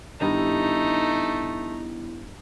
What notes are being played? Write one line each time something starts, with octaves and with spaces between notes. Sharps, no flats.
G2 D#3 A3 B3 D#4 E4